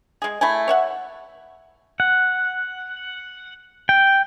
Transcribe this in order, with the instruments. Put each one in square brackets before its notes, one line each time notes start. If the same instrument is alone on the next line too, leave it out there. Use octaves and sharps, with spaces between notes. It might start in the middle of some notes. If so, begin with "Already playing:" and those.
[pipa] G#3 G#4
A3 E4 G#5
C#5 E5 F#5
[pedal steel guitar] F#5
G5